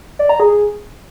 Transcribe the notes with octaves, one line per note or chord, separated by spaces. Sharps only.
D5
A#5
G#4